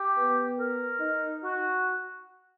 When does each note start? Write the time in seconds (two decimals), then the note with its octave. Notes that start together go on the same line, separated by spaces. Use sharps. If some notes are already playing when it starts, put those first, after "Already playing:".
Already playing: G4
0.17 B3
0.59 A#4
1.00 D#4
1.42 F#4